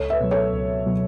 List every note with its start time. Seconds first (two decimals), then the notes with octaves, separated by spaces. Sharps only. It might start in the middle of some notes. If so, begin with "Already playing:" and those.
Already playing: C#2 A4 C#5
0.10 B4 E5
0.20 B2 F#3
0.31 A4 C#5
0.53 C#2
0.86 B2 F#3